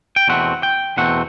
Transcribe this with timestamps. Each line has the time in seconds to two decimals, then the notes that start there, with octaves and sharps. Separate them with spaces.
0.16 G5
0.28 E2 B2 A3 C4 F#5
0.63 G5
0.97 E2 B2 A3 C4 F#5